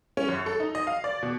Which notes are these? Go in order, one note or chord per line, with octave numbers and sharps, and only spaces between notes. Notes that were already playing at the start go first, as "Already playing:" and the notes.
C#4
F#2
A4
D#4
D#5
F5
D5
B2